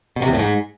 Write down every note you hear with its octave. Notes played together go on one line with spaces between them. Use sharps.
B2
C3
E2
A2
G#2